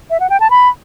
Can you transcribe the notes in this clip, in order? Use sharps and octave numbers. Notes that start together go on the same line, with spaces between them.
E5
F#5
G5
A5
B5